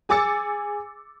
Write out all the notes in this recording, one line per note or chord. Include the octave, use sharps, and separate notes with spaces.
G#4 G#5 D6 E6 A6 C#7